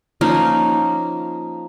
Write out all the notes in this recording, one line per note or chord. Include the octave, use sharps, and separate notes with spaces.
F3 A#3 C#4 D#4